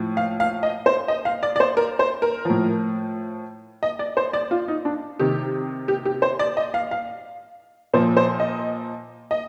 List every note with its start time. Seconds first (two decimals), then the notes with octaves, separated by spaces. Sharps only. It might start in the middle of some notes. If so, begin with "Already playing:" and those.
Already playing: A2 F3
0.17 F5
0.40 F5
0.63 D#5
0.86 C5
1.08 D#5
1.25 F5
1.43 D5
1.56 D5
1.60 C5
1.77 A#4
1.99 C5
2.22 A#4
2.45 A2 F3
3.83 D#5
3.99 D5
4.17 C5
4.33 D5
4.51 F4
4.68 D#4
4.85 D4
5.19 C3 D#3 G4
5.88 G4
6.05 G4
6.22 C5
6.39 D5
6.57 D#5
6.74 F5
6.91 F5
7.94 A#2 F3 C5
8.17 C5
8.40 D#5
9.31 D#5